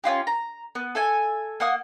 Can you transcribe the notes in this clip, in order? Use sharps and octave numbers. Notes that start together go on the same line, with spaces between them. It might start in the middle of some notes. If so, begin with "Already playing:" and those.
C#4 D#4 F4 G4
A#5
B3
A4 E5 G#5
A#3 F#5 D#6 F6